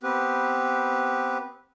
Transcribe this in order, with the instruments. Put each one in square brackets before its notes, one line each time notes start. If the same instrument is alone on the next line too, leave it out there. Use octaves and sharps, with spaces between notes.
[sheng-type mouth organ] B3 C4 G4 B4